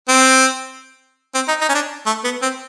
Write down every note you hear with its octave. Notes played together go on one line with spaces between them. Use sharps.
C4
C4
D#4
D#4
C#4
D4
A3
B3
C4